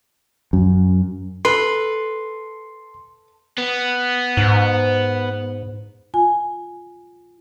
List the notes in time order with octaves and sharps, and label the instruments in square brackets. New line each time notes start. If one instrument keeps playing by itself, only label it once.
[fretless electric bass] F#2
[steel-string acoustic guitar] A4 [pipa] B4 [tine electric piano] C6
[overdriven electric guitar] B3
[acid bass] G#2
[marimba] F4 G#5